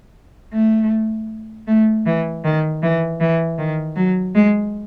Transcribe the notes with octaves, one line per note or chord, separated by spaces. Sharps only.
A3
A3
E3
D#3
E3
E3
D#3
F#3
G#3